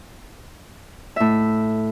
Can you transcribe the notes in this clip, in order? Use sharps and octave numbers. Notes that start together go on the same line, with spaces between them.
A2 E5